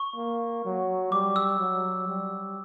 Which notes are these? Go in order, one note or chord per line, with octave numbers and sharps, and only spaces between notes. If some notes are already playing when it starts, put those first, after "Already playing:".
Already playing: C#6
A#3
F#3
G3 D6
E6
F#3
G3